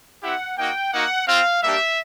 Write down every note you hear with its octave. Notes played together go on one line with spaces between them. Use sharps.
C4 E4 G4 F#5
A#3 D#4 F#4 G5
A#3 D#4 F#4 F#5
C4 F4 F5
G3 A#3 D4 G4 E5